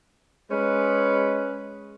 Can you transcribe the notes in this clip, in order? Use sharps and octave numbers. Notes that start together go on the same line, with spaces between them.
G#3 C#4 B4